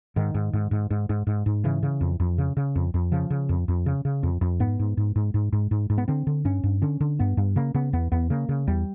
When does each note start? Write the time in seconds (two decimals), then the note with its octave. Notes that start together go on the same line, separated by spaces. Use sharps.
0.16 G#2 D#3
0.35 G#2
0.53 G#2
0.71 G#2
0.91 G#2
1.09 G#2
1.27 G#2
1.46 G#2
1.64 C#3 E3
1.83 C#3
2.01 F2
2.20 F2
2.38 C#3
2.57 C#3
2.76 F2
2.94 F2
3.12 C#3 F3
3.30 C#3
3.49 F2
3.68 F2
3.86 C#3
4.05 C#3
4.23 F2
4.41 F2
4.60 G#2 B3
4.79 G#2
4.97 G#2
5.16 G#2
5.34 G#2
5.53 G#2
5.71 G#2
5.90 G#2
5.98 B3
6.08 D3 C4
6.27 D3
6.45 G2 C#4
6.64 G2
6.82 D3 C#4
7.01 D3
7.19 G2 B3
7.37 G2
7.56 C#3 A#3
7.74 C#3 B3
7.93 E2 B3
8.12 E2 B3
8.30 C#3 A#3
8.49 C#3
8.68 E2 G3